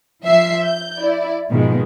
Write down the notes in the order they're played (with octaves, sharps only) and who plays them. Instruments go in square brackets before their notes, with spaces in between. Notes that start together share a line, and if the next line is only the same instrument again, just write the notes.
[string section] F3 E5 C7
G6
E4 D5
G#2 B2 D#3 F3 G#3